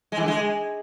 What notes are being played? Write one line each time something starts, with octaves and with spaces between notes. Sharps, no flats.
G#3
E3
D3
G#3